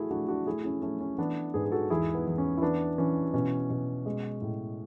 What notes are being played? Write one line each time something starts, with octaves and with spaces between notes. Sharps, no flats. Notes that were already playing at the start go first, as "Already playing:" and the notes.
Already playing: A3 E4 F#4 G#4 A4
A3 D4 F#4
D4 F#4
A3 E4 G#4
C#4 E4
A3 C#4
C#4
E3 B3 D4
G#2 G#4 B4
G#4
F#4 A4
E2 E4 G#4
B3
E2
C#4
E4
E3 B3 D4
E3 C#4
B2 C#4
B2
G#3
A2